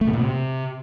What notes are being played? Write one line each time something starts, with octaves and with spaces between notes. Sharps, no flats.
A3
B2
A#2
C3